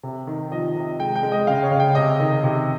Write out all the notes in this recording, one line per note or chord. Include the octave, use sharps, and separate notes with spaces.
C3
D#3
F3 D#5
C3
G#3 G5
G5
G#3
D#5
C#3 F5
C#5
C#3
G5
C3 D#5
D#3
C3